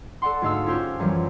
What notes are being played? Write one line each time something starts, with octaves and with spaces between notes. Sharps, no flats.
A4 D5 F#5 C6
D2 G#2 F5 E6
C#4 F4 G4 C5 C#5
F#2 E3 F3 G3